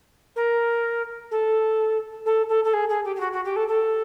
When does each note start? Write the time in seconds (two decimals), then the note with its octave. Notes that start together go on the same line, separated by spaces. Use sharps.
0.35 A#4
1.31 A4
2.25 A4
2.48 A4
2.64 A4
2.73 G#4
2.89 G#4
3.04 G4
3.15 G4
3.20 F#4
3.32 F#4
3.44 G4
3.56 A4
3.67 A4